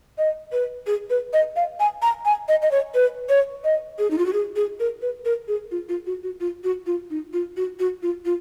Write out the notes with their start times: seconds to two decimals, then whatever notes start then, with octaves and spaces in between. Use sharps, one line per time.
0.18 D#5
0.52 B4
0.87 G#4
1.10 B4
1.33 D#5
1.56 F5
1.80 G#5
2.02 A#5
2.25 G#5
2.49 D#5
2.62 D#5
2.71 C#5
2.95 B4
3.29 C#5
3.64 D#5
3.99 G#4
4.11 D#4
4.18 F4
4.26 F#4
4.33 G#4
4.56 G#4
4.80 A#4
5.02 B4
5.25 A#4
5.48 G#4
5.71 F4
5.89 F4
6.06 F#4
6.23 F#4
6.40 F4
6.64 F#4
6.86 F4
7.10 D#4
7.33 F4
7.57 F#4
7.79 F#4
8.03 F4
8.25 F4